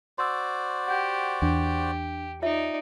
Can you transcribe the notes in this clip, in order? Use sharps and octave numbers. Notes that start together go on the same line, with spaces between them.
F#4 C5 D5 C6 E6
G4 F#5 G6
E2 D4 G4
D#4 F4 C#5 D5 E5